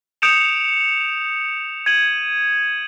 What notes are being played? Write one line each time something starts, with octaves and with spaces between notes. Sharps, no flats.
D#6 G6 C#7 D7 E7 F7
G#6 D#7 F#7